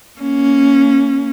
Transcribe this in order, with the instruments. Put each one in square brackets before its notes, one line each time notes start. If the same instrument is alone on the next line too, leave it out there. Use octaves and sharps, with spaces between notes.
[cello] A#3 C#4